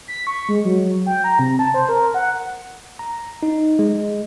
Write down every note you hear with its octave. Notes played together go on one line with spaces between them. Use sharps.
B6
C#6
G#3
F#3
G5
A#5
C3
A5
C5
A#4
F#5
A#5
D#4
G#3